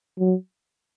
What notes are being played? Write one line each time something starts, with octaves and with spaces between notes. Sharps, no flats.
F#3